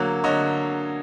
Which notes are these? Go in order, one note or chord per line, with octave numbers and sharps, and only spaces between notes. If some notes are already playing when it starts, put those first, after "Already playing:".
Already playing: D3 F#3 A#3 C#5
D3 C#5 D#5